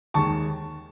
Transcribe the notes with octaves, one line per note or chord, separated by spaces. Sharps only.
D#2 D#3 G#3 A5 C#6